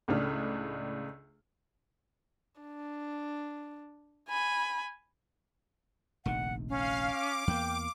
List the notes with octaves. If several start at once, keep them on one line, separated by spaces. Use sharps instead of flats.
C#2 A2 C#3 D4 F6
D4
G#5 B5
F1 A#1 D#3 F#5
C#4 F5
D6
E2 A#3 G5